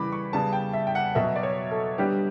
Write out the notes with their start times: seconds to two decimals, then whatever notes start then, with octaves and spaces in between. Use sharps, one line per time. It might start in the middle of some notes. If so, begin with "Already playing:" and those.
Already playing: C#3 E3 G3 B5 D6
0.12 C#6
0.33 C#3 G3 B3 A5
0.53 G5
0.73 E5
0.87 G5
0.95 F#5
1.15 B2 F#3 B3 E5
1.36 D5
1.43 C#5
1.71 A4
1.98 D3 G3 B3 G4